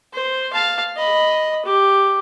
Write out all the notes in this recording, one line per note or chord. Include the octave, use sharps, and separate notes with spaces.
C5
F5 A5
D#5 B5
G4